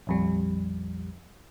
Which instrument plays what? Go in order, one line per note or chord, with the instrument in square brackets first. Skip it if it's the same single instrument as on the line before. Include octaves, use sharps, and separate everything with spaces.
[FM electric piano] A#1 F2 G3